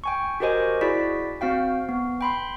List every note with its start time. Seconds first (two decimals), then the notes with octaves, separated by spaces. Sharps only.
0.04 G5 G#5 C#6
0.40 F#4 G4 A#4 C5 D#5 G#5
0.81 E4 F#4 G#4 D5 B6
1.41 C4 F#4 F5 G5
1.89 B3
2.21 G5 B5 C6